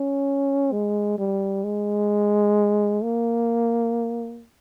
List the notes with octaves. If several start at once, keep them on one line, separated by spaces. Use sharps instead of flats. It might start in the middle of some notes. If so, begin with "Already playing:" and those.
Already playing: C#4
G#3
G3
G#3
A#3